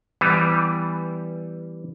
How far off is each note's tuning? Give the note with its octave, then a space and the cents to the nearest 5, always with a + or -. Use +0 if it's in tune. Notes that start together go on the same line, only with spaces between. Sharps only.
E3 +0 G3 +0 B3 +20